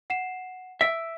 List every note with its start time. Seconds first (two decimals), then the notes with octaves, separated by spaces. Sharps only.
0.10 F#5 C7 E7
0.81 E5 E6 D7